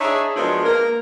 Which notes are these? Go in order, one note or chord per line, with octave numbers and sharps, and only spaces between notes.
D4 D#4 G#4 C#5 E5
F3 F#3 G#3 A#3 B3 D4
A#3 A#4